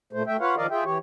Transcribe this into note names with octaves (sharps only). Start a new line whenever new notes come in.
A#2 A3 C5
A3 E5 G5
F4 B4 C#5 F5 F#5
D#3 F3 A#4 D5 D#5 F5
F4 G#4 E5 G5
E3 G4 C#5